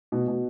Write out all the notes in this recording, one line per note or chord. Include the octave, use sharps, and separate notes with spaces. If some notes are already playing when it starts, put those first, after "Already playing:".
B2
B2